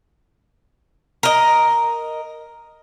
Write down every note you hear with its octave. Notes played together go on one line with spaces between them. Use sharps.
A#4 D#5